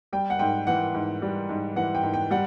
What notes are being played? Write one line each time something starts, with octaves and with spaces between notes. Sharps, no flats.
G3 G5
F#5
G#2 G5
E3 F#5
G#2
G3
G#2
E3 F#5
G5
G#2
G5
G3 F#5